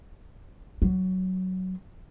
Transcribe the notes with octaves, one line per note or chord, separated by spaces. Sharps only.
F#3